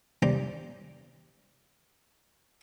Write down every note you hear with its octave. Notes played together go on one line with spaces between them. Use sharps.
G3 C5 D5 A#5 D6